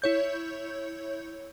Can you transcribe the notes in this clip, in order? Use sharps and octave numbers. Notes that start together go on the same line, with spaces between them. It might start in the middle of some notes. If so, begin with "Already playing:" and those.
E4 C#5 G6